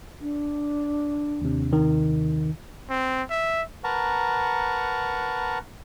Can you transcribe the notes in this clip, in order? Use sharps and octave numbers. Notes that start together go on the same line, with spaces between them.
D4
D#2 C3
D#3
C4
E5
A#4 B4 F#5 A5 A#5 C#6